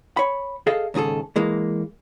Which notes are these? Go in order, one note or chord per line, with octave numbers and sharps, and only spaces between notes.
C#5 B5
G#4 A4 D#5 F5
D#2 G#2 C#3 G#4 A4
E3 G#3 A#3